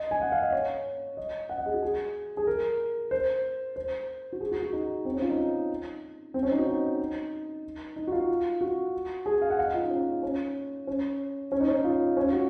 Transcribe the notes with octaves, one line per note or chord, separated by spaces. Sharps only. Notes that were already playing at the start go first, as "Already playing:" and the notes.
Already playing: D#5
G#5
F#5
F5
D#5
C#5
D#5
F#5
D#5
G#4
F#4
G#4
G#4
A#4
C5
C5
F#4
G#4
F#4
F#4
D#4
C4
C#4
F4
D#4
C4
C#4
D#4
F#4
D#4
D#4
F#4
F4
F#4
G#4
F5
F#5
F5
D#5
F4
D#4
C#4
C#4
C#4
C#4
D#4
C#4
F4
C#4
F4
F#4